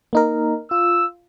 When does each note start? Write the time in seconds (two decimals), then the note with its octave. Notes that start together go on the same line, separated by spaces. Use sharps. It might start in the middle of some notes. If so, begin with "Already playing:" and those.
0.13 A#3 D#4 A#4
0.71 F4 E6